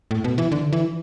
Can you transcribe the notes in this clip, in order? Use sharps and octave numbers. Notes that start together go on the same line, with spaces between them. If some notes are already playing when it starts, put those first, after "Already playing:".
A2
B2
E3
D3
E3